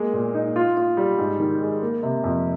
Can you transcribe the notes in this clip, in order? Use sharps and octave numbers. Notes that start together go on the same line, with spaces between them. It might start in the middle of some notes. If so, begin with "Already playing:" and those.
Already playing: G#3 A#3
A#2
D#4
F4
F4
G3
G#2
D#3
G#3
A#3
C3
F2